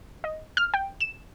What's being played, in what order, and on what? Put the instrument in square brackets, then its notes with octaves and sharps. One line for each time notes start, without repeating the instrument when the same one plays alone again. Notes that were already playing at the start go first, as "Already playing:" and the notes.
[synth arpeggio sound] D#5
F6
G5
E7